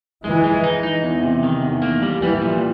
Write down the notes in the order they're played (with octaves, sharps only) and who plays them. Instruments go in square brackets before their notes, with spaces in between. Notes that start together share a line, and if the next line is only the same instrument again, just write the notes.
[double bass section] E3 [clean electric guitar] G#3
[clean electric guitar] G#3
D#4
D#4
E2
C3
D#3
E2
A#3
G3
[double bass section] E3 [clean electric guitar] G3
[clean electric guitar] A#2